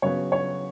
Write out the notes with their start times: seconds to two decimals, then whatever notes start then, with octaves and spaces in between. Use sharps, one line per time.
0.02 C#3 F#3 B3 C#5
0.32 C#5